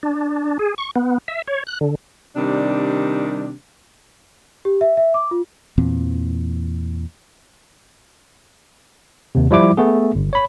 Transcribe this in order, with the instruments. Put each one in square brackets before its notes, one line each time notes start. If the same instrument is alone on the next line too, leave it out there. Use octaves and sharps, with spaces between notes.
[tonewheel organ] D4
G#4
C#6
B3
E5
C#5
F#6
D3
[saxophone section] C3 D#3 G3 D4
[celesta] G4
E5
E5
D6
F4
[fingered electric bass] E2 A#2 E3 C4
[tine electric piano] D#2 C3
F3 G3 E4 D6
A3 B3 G#4
G1
C#5 B5